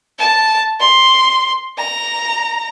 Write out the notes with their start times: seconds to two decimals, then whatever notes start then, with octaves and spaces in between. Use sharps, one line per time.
0.19 A5
0.80 C6
1.78 A#5